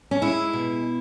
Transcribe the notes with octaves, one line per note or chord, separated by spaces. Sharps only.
C#4
G#3 E4
B2